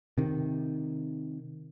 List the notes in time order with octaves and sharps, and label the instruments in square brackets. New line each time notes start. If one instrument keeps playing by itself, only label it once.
[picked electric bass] C3 D#3